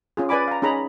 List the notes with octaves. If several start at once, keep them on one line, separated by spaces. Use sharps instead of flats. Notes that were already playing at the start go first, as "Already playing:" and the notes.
C#4 F4 G#4
B4 D5 G#5 B5 D6
F5 A#5
C#4 D#4 G#4 A#5 B5